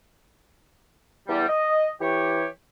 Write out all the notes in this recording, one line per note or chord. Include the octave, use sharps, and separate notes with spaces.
E2 G3
D#5
E3 G4 C#5